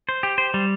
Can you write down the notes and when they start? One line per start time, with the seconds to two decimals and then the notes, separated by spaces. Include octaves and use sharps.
0.09 C5
0.23 G4
0.38 C5
0.54 G3